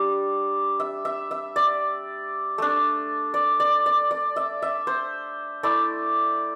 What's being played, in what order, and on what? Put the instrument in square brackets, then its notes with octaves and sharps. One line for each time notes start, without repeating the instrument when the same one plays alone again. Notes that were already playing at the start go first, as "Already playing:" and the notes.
Already playing: [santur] G3 D4
E5
E5
E5
D5
A3 D4
D5
D5
D5
D5
E5
E5
C5
A3 E4 D5